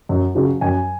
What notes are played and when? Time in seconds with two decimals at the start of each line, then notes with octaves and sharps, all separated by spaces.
0.09 F#2
0.35 C#3 F#3
0.61 F#2 G#5